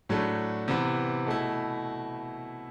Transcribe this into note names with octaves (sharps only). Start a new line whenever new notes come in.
A2 F#3 A3 D4
C3 E3 B3
B2 A3 E4